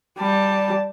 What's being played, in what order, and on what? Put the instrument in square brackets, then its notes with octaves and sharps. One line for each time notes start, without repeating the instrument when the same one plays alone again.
[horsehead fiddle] G3 A5